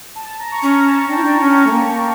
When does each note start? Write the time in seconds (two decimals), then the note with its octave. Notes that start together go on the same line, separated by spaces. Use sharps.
0.16 A5
0.39 A#5
0.52 C#6
0.62 C#4 A#5
0.85 A5
1.08 D4 G5
1.17 E4
1.24 D4
1.40 C#4
1.67 A3
1.72 A#3